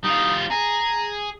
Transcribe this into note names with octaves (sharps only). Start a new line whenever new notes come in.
G3 D#4 F4
G#4 A#5